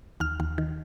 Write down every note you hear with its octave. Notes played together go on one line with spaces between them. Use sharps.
D#2 F6
D#2
D#3